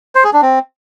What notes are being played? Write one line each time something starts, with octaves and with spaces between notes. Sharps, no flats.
C5
G#4
D4
C4